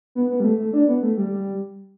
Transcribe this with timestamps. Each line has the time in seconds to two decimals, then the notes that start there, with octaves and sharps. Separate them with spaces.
0.15 B3
0.30 B3
0.40 G3
0.44 A3
0.59 A3
0.73 D4
0.88 B3
1.03 A3
1.17 G3
1.32 G3